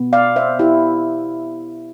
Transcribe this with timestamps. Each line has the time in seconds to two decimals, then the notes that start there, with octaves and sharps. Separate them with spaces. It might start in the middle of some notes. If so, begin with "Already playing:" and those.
Already playing: B2 B3
0.13 D5 F5
0.36 C5 E5
0.59 E4 G4